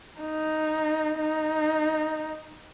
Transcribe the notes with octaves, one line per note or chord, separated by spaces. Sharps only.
D#4
D#4